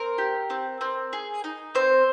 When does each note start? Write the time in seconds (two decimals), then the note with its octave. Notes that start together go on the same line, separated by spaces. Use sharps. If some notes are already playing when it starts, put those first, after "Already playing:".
Already playing: C4 A#4
0.18 G4
0.50 C4
0.81 C4
1.13 G#4
1.44 D#4
1.75 C4 C5